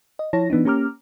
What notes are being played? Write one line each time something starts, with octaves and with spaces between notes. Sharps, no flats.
D#5
F3 E4 C#5 A5 A#6
E3 B3 D4 D#4
A#3 C#4 G4 A#5 D6 F6